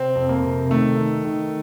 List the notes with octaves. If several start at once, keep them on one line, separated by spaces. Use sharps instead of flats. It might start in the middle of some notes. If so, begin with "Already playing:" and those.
Already playing: C3 C4
F2
A#3
C3
D#3 A3
D#3
D#3